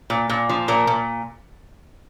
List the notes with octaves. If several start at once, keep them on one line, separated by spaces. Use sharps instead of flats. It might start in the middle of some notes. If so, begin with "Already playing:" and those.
A#2
A#2
F3
A#2 A#4
A#2